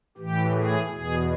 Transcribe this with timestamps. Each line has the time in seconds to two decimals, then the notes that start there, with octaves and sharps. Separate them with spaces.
0.18 A2 E3 G4
0.54 G#4
0.90 E2 B2 G#4